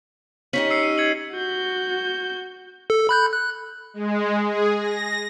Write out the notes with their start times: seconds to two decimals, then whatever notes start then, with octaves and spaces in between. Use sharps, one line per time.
0.53 C#4 D#4 G4 B6 F#7
0.71 E6 C7 C#7
0.83 D#7
0.98 G#6 C#7 F#7
1.33 F#4 G6
2.90 A4
3.09 B5 F#6 G6
3.33 F#6
3.94 G#3
4.46 G#4
4.79 A#6